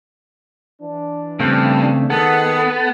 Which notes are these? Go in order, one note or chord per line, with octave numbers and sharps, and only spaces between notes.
E3 D4
G2 C#3 A3 C4
D#3 B3 G#4 A4 F#5